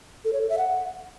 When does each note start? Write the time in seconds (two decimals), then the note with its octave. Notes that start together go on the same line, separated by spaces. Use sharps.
0.25 A4
0.33 C#5
0.41 A4
0.50 E5
0.58 F#5